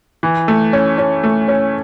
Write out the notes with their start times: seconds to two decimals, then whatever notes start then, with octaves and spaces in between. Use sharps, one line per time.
0.23 E3
0.48 A3
0.73 C#4
0.98 C#4
1.23 A3
1.48 C#4